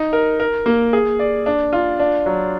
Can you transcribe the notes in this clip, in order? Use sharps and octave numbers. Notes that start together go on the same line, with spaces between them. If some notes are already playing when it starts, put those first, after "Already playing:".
Already playing: D#4
A#4
A#4
A#3
G#4
D5
D4
F4
D4
F#3